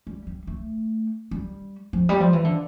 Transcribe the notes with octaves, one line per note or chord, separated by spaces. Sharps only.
G3
G3
A3
G3
F3
G3
F3
E3
D3